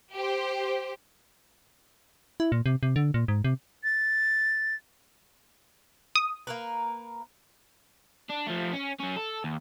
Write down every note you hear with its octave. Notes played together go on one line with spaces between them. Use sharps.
G4 C5
E4
A#2
C3
C3
D3
A#2
G#2
C3
A6
D#6
A#3 A#4 B4
D4
F3 A3
C#4
F#3 C#4
A4
D#2